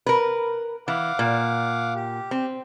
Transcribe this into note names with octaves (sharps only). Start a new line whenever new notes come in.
A#4 B4
E3 F5 F#5 D6
A#2
G4
C4